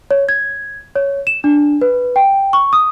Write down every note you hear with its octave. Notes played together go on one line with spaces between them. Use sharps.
C#5
G#6
C#5
E7
D4
B4
G5
C#6
D#6